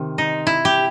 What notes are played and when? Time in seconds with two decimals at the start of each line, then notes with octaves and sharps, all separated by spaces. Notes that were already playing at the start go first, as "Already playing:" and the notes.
Already playing: C3 D#3
0.18 D#4
0.47 E4
0.65 G4